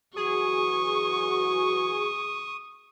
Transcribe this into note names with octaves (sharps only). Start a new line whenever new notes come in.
E3 F#3 F#4 G#4 C#6 D#6